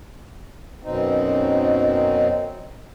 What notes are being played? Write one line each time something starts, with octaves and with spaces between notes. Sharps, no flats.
F#2 B2 C4 D#4